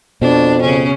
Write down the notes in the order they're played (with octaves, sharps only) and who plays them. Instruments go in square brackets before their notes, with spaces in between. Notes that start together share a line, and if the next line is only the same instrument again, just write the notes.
[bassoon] F2 [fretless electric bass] B2 [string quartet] D4
[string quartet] C#3 C#4